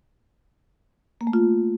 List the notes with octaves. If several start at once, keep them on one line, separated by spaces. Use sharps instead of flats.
A#3
A3
F4